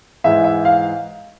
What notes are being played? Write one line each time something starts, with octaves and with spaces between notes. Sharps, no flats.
G#2 E3 G#3 E5
E5
F5